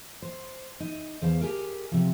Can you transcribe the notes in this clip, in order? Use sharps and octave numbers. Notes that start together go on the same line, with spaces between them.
C5
D#4
E2 C5 F5 A5
G4 G#4 A#4
C3 F3